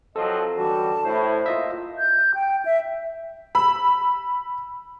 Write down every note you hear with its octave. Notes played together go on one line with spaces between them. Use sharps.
F3 F#3 C4 A4 D#5
F#2 D3 E3 G3 F#4 A5
A2 E4 C5
A#3 F4 D#5 E5
G6
G5
E5
B5 E6